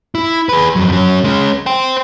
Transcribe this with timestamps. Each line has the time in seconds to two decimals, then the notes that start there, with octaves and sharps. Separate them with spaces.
0.15 E4
0.49 G#4 B4
0.76 F2 F#3
0.92 F#3 C#4
1.24 G#3 C#4
1.66 C5 G5